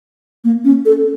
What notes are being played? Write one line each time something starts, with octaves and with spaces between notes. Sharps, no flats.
A#3
C#4
A4